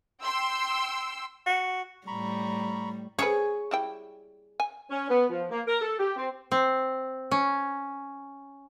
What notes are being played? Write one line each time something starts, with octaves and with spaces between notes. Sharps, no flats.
G5 C6 E6
F#4
A2 G3 A#5 B5 C#6
C#4 G#4 A4 B4 C#5
G3 E4 G5
G#5
C#4
B3
F3
A#3
A#4
A4
G4
C4
C4
C#4